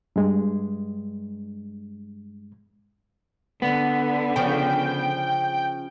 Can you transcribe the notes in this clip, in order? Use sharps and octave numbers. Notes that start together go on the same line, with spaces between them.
G2 G#3
D3 B3
C#3 F3 G5